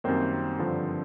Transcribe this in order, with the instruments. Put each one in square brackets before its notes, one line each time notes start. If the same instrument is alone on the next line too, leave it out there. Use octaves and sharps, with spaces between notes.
[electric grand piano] F#2 D#3 G3 A#3 [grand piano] C4
[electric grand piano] G2 D3 F3